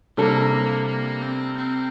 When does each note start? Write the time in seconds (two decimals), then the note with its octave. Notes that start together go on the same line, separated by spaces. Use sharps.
0.17 C3 G3 A#3 D4 A4
0.87 A#3
1.22 C4
1.57 C4